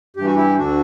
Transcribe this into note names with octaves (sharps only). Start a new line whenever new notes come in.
G2 E3 G4
F#4
E4 G4
D2 D3 D4 F#4